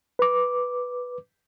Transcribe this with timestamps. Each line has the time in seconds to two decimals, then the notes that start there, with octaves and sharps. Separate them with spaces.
0.19 B4 D6